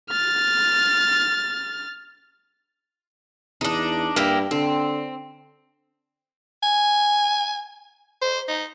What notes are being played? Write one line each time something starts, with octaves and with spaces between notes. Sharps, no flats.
F6 A6
E2 D4 D#4
G2 A#3 E4 G4
D3 C4
G#5
C5
D#4